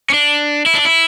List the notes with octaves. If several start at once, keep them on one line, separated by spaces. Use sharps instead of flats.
C#4
D4
E4
D4
E4